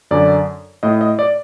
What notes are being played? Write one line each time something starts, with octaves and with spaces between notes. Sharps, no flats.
F#2 D3 D5
A2 D#5
D#5
D5